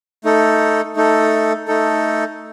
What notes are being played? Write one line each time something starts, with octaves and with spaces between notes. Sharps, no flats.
A3 D#4 A4
A3 D#4 A4
A3 D#4 A4